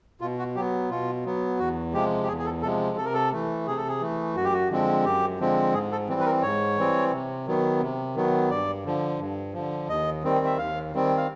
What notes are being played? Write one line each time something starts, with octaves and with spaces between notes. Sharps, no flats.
B2 F4
F#4
F#3 B3 G4
B2 F4
F#3 B3
E2 F#4
C3 F3 G#3 G4
G4
E2 G#4
G#4
A4
C3 F3 G#3 A4
C3 A4
A#4
A4
E3 A3
C3 G#4
A4
G#4
E3 A3
F#2 F#4
G4
F#4
D3 F3 G#3 C4
F#2 G4
D3 F3 G#3 C4
G#2 G#4
A4
E3 G3 C4
B4
A#4
G#2 C#5
E3 G3 C4
C3
D#3 F#3 B3
C3
D#3 F#3 B3
G2 D5
D3 F3
G2
D3 F3
D#2 D#5
D#3 G3 C4
E5
D#2 F5
D#3 G3 C4
F5